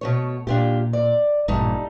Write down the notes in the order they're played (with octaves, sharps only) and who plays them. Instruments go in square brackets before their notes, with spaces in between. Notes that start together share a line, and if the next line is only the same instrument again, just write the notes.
[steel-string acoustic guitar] B2 A3 C#5
[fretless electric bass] A#2 [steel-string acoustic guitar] D4 F4 G4
[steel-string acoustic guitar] D5
[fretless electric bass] A1 G2 A#2 [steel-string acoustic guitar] G3 A3 D#4